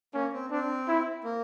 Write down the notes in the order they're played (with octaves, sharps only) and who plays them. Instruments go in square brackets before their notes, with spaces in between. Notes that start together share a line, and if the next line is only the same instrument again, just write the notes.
[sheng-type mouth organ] A#3 [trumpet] C#4
[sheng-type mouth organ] C4
[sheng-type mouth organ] C4 [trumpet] D4
[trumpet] E4
[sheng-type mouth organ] A#3